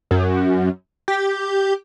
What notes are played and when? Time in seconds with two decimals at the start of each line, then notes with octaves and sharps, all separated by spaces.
0.11 F#2
1.08 G4